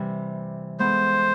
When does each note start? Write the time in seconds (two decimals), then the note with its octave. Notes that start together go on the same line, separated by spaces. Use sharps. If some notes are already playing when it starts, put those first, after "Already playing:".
Already playing: C3 E3 G3
0.79 G#3 B3 E4 A4 C5